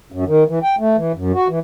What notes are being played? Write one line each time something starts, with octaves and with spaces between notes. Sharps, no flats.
F#2
D#3
E3
G5
A3
E3
F#2
F#4
E3